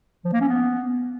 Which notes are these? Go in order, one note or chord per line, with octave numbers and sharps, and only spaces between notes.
F3
A#3
C#4
B3